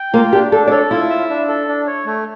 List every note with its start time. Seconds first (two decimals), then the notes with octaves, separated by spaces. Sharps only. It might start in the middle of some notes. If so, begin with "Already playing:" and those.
Already playing: G5
0.14 A#3 F4
0.33 D4 G4
0.52 D4 A4
0.68 D5
0.71 A4 C#5
0.91 E4 F4
1.10 E5
1.30 D4
1.48 A4
1.68 D4
1.87 C#5
2.05 A3